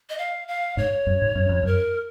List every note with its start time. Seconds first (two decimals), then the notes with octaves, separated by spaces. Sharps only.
0.10 D#5
0.18 F5
0.48 F5
0.77 G#2 C#5
1.07 F#2
1.22 G#2
1.35 F#2
1.49 F2
1.63 F#2 A#4